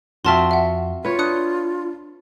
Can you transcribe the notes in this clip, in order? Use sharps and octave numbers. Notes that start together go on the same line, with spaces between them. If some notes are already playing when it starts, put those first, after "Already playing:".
F2 C4 F4 F#4 E5 A5 C6
E5 F#5
F4 B4 C#5
D4 D#6 F#6 C#7